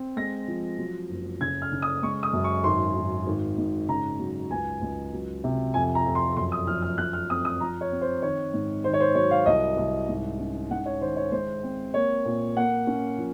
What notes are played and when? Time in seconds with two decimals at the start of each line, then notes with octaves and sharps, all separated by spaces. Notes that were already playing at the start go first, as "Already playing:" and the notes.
Already playing: C4
0.17 G#3 A#6
0.48 F3
0.78 F#3
1.09 F#1
1.41 C#3 G#6
1.62 F6
1.72 C#3
1.82 D#6
2.03 G#3 C#6
2.23 D#6
2.33 F#2
2.44 C#6
2.64 G#1 C6
2.96 G#1
3.27 G#1
3.58 G#2
3.89 C#3 A#5
4.19 F#3
4.50 C#2 G#5
4.81 C#2
5.13 F#3
5.44 C3
5.74 F2 G#5
5.95 A#5
6.06 F2
6.15 C6
6.37 F#2 C6
6.52 D#6
6.67 F3 F6
6.82 F6
6.98 F#2 F#6
7.13 F6
7.30 C4 D#6
7.45 D#6
7.60 F3 A#5
7.81 C#5
7.92 C4
8.01 C5
8.22 D#3 C#5
8.54 G#2
8.84 D#3 C5
8.93 C#5
9.00 C5
9.15 F#3 C#5
9.31 F5
9.46 C2 D#5
9.77 C2
10.08 G#2
10.39 C#4
10.70 G#2 F#5
10.86 C#5
11.01 D#3 C5
11.16 C#5
11.32 G#3 C5
11.63 C4
11.94 A#3 C#5
12.25 A#2
12.56 A#3 F#5
12.87 C#4
13.18 F3